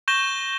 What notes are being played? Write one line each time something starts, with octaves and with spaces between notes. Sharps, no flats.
C#6 G6 A#6 E7 G7